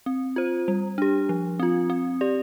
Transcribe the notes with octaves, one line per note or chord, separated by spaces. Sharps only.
C4
F4 C5
G3
D4 G4
F3
C4 F4
C4
G4 D5